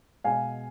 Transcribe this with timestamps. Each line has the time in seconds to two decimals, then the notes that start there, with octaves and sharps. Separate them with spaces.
0.24 B2 G#3 F5 G#5